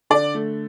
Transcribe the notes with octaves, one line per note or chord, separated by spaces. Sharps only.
D3 D5
A3